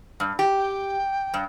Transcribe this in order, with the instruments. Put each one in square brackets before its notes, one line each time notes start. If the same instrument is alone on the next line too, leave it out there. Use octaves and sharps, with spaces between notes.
[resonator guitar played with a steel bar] G2
G4
[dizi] G5
[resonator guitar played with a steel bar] G2